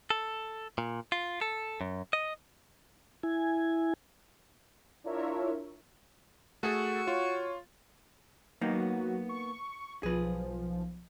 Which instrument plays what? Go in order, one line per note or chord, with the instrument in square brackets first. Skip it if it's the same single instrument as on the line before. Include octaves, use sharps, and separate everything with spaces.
[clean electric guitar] A4
A#2
F4
A4
F#2
D#5
[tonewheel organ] E4 G#5
[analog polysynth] D4 E4 F4 A#4 C#5 E5
[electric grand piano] A3 G#4 A4 [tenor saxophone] F#4
[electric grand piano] F4 [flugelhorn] C#5
[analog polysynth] F#3 F#4 [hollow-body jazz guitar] A#3 B3 D#4
[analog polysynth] C#6
[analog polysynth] B1 F3 [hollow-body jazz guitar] G#4 B4